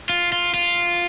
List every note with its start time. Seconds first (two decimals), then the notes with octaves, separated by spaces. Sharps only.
0.09 F4
0.32 F4
0.54 F4